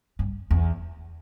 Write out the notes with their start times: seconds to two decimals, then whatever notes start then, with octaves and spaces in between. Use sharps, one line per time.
0.19 G2
0.51 E2